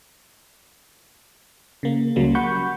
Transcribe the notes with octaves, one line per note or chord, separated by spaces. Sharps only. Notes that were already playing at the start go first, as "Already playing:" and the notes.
C#3 A#3
C#2 C#3 F#3 G3 A#3
F#5 B5 C#6 G6